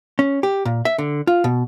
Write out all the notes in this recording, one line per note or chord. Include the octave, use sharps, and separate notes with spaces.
C#4
G4
A#2
E5
D3
F4
B2